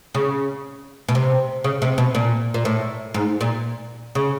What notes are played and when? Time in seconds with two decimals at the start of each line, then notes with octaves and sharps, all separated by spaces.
0.15 C#3
1.09 B2
1.15 C3
1.64 C#3
1.82 C3
1.98 B2
2.15 A#2
2.54 A#2
2.65 A2
3.14 G#2
3.41 A#2
4.15 C#3